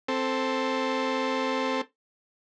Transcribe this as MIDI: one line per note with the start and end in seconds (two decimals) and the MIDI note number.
0.08 1.81 60
0.08 1.81 69